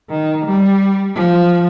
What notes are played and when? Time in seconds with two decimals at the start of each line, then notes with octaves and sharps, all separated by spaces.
0.10 D#3
0.45 G3
1.15 F3